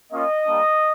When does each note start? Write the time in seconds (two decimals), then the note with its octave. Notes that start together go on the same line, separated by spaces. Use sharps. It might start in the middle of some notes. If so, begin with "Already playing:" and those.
0.11 A#3 C#4 F4 D#5
0.47 G3 A#3 D4